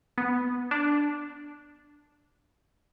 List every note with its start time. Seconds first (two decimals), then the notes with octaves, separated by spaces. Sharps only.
0.18 B3
0.71 D4